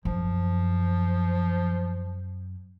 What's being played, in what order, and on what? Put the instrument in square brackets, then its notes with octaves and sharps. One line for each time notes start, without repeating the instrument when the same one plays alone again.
[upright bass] F#2 [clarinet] F3